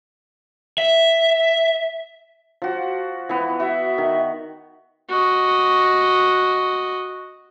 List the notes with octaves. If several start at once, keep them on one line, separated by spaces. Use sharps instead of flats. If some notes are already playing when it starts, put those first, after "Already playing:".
E5
F3 F#4
E3 B3
F#4 E5
D#3
F#4 D#5